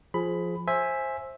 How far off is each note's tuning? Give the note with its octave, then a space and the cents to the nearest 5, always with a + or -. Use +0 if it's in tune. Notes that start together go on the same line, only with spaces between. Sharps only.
F3 +0 G#4 +15 B5 +10
C5 +15 E5 +0 G#5 +0